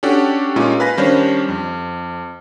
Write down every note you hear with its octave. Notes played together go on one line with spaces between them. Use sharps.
C#4 D4 F#4 G4 A4
A#2 G#3 C#4 D#4 F4
B4 F5 G#5 B5 A#6
D#3 G3 C#4 D4 C5
F2